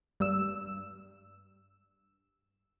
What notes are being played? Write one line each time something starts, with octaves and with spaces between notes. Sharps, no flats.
G2 E6